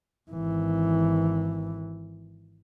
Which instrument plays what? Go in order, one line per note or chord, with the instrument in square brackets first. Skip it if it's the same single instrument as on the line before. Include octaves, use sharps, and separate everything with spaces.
[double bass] G#1 E3